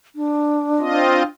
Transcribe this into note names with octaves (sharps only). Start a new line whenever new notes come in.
D4
C4 F4 D#5